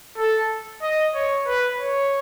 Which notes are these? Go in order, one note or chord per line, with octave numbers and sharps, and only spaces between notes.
A4
D#5
C#5
B4
C#5